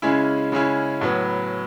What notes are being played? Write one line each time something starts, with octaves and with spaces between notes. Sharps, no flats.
C#3 G#3 C#4 E4
C#3 G#3 C#4 E4
A2 F#3 B3